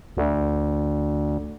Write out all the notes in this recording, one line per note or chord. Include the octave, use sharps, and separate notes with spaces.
D2